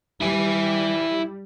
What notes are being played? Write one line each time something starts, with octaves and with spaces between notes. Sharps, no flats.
G3 E4 G#5